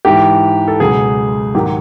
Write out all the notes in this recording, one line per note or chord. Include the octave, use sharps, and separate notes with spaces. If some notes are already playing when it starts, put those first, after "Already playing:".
G#2 E3 G4
A4
C#2 B2 F#3 G#4
G#2 D#3 F#3 G4